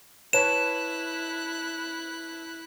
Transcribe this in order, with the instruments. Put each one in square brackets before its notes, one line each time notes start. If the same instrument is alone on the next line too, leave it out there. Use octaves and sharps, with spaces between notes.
[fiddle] E4 F#6 [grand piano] B4 C#5 A5 [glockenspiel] E7